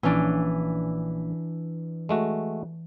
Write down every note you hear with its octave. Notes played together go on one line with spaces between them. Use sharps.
A#1 E3 C#4 D4
G#3 A3 F#4